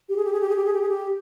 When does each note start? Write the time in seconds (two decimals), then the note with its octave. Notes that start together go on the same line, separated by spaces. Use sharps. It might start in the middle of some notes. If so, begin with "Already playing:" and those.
0.09 G4
0.16 G#4
0.25 G4
0.32 G#4
0.41 G4
0.49 G#4
0.56 G4
0.65 G#4
0.73 G4
0.81 G#4
0.89 G4